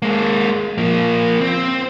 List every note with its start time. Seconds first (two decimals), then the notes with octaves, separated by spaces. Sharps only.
0.02 G#3 A#3
0.78 F3 A#3
1.41 C4